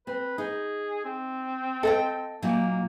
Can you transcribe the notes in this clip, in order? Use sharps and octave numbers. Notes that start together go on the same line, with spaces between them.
C4 B4
D#4 G#4
C4
A4 D#5 F5 G5
A#2 F#3 A#3 D#4